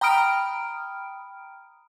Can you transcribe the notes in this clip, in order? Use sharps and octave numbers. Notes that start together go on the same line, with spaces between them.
G5 A#5 B5 D#6 F6 D7